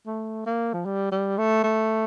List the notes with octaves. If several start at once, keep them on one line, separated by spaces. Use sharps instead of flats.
A3
A#3
F3
G3
G3
A3
A3